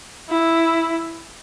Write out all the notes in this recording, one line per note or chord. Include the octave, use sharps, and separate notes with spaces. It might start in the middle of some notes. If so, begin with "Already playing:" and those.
E4